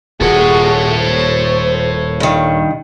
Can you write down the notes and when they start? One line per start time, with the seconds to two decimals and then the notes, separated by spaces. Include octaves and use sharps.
0.21 D#1 A#2 F#4 G#4 A4 C#5
0.97 C5
2.20 G2 D#3